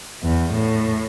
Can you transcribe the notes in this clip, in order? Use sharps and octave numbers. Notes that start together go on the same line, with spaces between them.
E2
A2